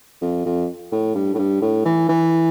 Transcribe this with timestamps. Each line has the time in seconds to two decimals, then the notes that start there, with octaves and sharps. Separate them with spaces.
0.21 F2
0.45 F2
0.92 A2
1.15 G2
1.34 A2
1.38 G2
1.62 A2
1.85 E3
2.09 E3